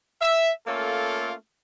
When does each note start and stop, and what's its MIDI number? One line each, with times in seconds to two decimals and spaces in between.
0.21 0.50 76
0.67 1.32 57
0.67 1.32 58
0.67 1.32 61
0.67 1.32 65
0.67 1.32 69